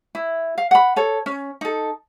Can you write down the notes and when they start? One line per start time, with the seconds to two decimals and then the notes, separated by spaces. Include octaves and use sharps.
0.15 E4
0.58 F5
0.71 F#5 B5
0.96 A4 C#5
1.26 C#4
1.61 D#4 A4